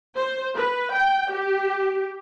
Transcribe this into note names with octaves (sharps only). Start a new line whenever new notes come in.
C5
B4
G5
G4